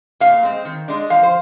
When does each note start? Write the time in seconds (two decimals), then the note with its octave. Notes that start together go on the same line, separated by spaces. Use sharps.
0.20 A#2 F5
0.43 G#3 C4
0.65 D#3
0.88 G#3 D4
1.10 F3 F5
1.23 C5